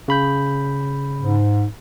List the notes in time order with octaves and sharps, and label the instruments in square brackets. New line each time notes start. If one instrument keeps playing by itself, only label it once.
[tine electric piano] C#3 B5 G6
[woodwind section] G#2